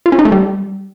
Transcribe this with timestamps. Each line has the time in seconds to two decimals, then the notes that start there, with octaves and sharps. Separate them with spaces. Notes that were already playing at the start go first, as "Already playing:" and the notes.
0.06 F4
0.12 C#4
0.19 D#4
0.25 A3
0.32 G3